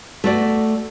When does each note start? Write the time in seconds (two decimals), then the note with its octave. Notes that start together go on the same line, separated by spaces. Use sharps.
0.24 A3 F#4 D5